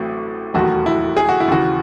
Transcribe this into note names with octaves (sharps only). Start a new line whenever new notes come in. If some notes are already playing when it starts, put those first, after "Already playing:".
Already playing: A1 A2 F#3 A3 C4
E1 D#2 D#3 F#3 A3 F#4
E4
G#4
F#4
E4
D#2 C#3 E3 F#4